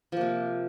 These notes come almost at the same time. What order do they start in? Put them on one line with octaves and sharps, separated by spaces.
F3 A#3 C3